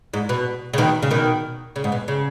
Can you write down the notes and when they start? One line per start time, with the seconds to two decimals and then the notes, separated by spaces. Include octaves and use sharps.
0.13 G#2
0.29 B2
0.73 C#3
0.78 B2 D#3
1.03 C#3
1.11 B2 D#3
1.76 C#3
1.84 G#2
1.92 B2
2.08 C#3